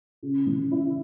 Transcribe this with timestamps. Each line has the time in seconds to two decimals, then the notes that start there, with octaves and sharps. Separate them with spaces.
0.23 C#3
0.46 E3
0.71 E4